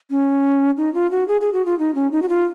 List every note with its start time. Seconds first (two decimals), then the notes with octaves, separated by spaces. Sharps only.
0.11 C#4
0.77 D#4
0.94 F4
1.11 F#4
1.28 G#4
1.41 G#4
1.53 F#4
1.66 F4
1.79 D#4
1.95 C#4
2.12 D#4
2.22 F#4
2.29 F4